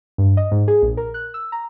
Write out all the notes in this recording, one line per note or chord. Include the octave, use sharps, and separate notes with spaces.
G2
D#5
G#2
G#4
A#1
A#4
F#6
E6
A#5